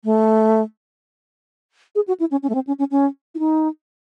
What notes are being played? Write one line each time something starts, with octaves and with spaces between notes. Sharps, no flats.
A3
G#4
F#4
E4
C#4
C#4
A3
C4
C#4
C#4
C#4
E4
D#4